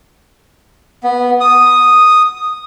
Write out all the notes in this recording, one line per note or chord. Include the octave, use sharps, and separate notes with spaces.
B3
D#6